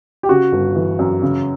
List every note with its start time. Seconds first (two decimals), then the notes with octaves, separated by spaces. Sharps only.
0.23 G4
0.29 C#3 F#4
0.52 G1
0.76 E3
0.99 F#2
1.22 C#3